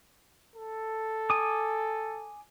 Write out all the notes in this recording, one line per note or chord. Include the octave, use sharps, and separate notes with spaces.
A4
G#5 D6 D#6